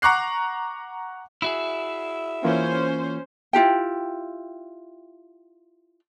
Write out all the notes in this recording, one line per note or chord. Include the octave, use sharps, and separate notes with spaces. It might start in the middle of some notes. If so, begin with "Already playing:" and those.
F#5 A#5 C#6 D6 F#6 C7
E4 F#4 G#4 E5
E3 A#3 C#4 F4 C5
E4 F4 G4 G5